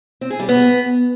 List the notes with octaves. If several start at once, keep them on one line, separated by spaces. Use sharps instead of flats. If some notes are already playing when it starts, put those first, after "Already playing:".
C4
G#4
G3
B3